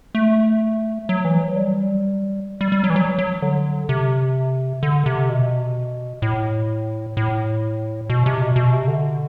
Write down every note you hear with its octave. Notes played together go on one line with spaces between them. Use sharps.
A3
F#3
E3
F#3
G3
G3
G3
F#3
E3
F#3
F#3
D3
C3
D3
C3
B2
A2
A2
B2
C3
B2
B2
C3
D3